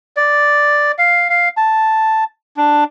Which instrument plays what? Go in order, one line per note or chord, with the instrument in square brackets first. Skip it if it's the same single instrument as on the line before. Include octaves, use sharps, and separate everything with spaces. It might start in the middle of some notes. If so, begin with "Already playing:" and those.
[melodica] D5
F5
F5
A5
D4